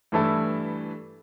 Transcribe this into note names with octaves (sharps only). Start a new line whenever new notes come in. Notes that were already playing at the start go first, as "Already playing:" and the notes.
G2 E3 A3 E4 A4